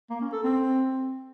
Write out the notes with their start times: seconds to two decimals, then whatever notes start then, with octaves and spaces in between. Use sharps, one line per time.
0.10 A#3
0.21 C#4
0.32 A4
0.43 C4